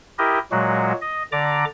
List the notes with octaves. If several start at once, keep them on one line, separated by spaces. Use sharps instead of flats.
E4 G4 A#4 D#5
A#2 F#3 G#3 F#4
D#5
D3 D5 A#5 D6